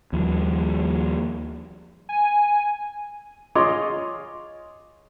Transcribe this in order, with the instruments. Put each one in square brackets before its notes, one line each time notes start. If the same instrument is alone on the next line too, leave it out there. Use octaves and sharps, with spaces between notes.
[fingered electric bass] D#2 F3 G3
[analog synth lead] G#5
[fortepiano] F4 G#4 C#5 D#5 C6 D6